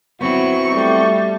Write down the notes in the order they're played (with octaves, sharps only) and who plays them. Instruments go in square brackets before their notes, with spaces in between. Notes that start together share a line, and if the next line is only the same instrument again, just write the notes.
[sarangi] F#3 [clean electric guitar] B3 C4 E4 [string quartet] C#6
[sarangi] G3 [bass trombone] A3